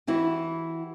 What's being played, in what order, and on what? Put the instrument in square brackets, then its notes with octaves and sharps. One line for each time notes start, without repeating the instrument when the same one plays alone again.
[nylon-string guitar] E3 E4 F#4 G4